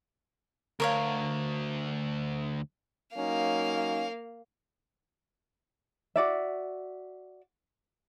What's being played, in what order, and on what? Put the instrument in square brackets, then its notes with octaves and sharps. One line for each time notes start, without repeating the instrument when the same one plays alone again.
[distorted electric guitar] D2 [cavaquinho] A#4 C#5 F5
[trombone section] F#3 C#4 D#4 [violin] A#3 F5
[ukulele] F#4 D5 E5